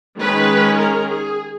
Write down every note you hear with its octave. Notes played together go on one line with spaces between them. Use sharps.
D#3 G#3 C#4 B4
A#4
G#4